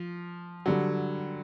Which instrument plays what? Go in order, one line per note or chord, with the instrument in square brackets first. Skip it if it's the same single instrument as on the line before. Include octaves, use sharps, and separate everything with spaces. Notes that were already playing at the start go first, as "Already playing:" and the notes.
Already playing: [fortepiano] F3
[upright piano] D3 G3 [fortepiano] F#3